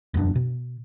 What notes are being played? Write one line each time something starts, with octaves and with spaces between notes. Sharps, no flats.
E1 F#2 B3 D4
B2